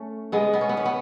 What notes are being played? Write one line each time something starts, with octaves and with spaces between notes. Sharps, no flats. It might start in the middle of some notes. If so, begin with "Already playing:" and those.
Already playing: A3 C#4
G#3 B3
B3
C#4
B3
C#4
B3